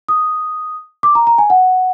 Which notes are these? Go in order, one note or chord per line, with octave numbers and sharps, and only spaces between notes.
D#6
D6
A#5
A#5
G#5
F#5